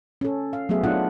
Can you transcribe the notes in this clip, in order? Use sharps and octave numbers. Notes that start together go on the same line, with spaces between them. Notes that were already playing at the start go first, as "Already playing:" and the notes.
C#4 A4
F5
F#3 A3 B3 G#4 E5
B3 D4 D#4 F4 F#5